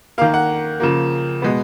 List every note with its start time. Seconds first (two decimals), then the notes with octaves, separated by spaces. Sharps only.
0.18 A#3 F5
0.21 D#3
0.34 F#5
0.80 C#3 F3 A#3
1.42 B2 G#3 B3